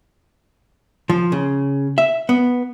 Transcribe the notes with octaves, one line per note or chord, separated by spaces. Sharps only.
F3
C#3
E5
B3